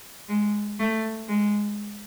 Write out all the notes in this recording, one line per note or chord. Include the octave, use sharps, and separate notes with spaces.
G#3
A3
G#3